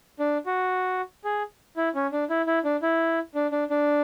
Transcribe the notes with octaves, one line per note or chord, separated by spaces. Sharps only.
D4
F#4
G#4
E4
C#4
D4
E4
E4
D4
E4
D4
D4
D4